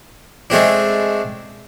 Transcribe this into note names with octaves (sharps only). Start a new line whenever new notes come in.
G#3 A3 C4 D4